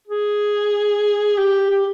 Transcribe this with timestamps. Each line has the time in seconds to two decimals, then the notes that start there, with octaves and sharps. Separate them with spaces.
0.07 G#4
1.38 G4
1.71 G4